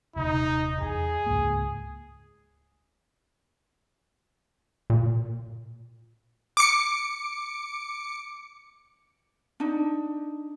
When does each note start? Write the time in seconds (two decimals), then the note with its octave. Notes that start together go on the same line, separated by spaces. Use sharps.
0.16 D#1 C3 D#4
0.81 E2 G#4
1.26 C#2 G#2 A#3
4.90 A#2
6.57 D6 C#7
9.60 D4 D#4